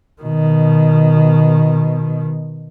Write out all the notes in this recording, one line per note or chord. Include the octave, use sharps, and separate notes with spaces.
B2 D#3